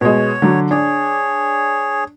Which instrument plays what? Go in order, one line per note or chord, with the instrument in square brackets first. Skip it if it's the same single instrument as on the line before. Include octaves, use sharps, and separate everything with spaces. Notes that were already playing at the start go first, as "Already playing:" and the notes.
[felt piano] B2 G#3 [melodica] C#5
[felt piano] D3 F#3
[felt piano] D4 [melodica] G#4 C#5